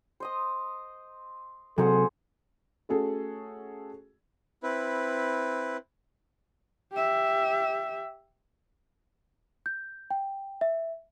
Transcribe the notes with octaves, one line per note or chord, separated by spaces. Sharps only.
C5 D#5 D#6
C3 F#3 G#4 A4 C5 F#5
A3 C#4 F#4 G#4 A4
C4 E4 B4
G4 E5
G6
G5
E5